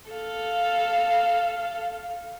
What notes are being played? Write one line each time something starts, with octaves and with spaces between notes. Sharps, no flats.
A4 F5